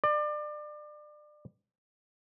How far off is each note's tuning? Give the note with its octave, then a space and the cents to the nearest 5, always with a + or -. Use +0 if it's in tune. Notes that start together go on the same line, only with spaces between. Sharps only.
D5 +30